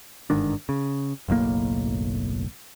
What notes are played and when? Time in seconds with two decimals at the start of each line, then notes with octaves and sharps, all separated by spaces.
0.30 G1 G#2 D#3 D4
0.69 C#3
1.28 F#1 B1 A2 A#3